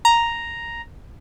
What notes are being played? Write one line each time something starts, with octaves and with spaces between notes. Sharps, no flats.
A#5